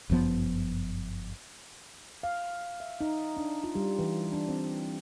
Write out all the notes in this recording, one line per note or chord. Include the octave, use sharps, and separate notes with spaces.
G1 F#2 F3 B3
F5
E5
D#4
D4
F4
G3
E3
D4
C4